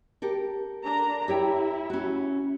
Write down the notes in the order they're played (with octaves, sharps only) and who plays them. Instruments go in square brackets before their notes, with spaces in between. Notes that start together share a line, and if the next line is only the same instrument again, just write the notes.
[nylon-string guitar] G4 A4 A#4
[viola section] D4 A#5
[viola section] E4 [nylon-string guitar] G4 C#5 G5
[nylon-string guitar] C#4 F#4